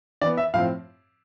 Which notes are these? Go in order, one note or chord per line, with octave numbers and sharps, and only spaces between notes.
E3 B3 D5
E5
A2 F3 C4 F5